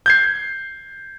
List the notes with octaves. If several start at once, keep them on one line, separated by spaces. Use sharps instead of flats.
G6 G#6 C7